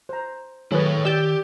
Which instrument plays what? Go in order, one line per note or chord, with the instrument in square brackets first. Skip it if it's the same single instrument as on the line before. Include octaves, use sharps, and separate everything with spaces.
[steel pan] C5 A#5
[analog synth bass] D#3 [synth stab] F#3 B4 [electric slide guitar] E4 A4 C#5 [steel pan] G#4
[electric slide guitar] G4 [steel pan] D5 [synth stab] E6 G6 A6